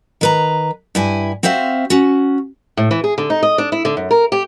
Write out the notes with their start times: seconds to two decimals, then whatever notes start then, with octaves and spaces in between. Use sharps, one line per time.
0.21 D#3 B4 A#5
0.95 G2 E4 G#5
1.43 C4 F#4 C5 E5 F5
1.90 C#4 F#4
2.77 A2
2.91 E3
3.04 G#4
3.18 D3
3.30 D#4
3.43 D#5
3.58 D4
3.72 E4
3.85 D3
3.97 F#2
4.11 A#4
4.32 G4